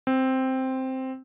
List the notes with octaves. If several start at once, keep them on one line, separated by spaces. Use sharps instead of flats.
C4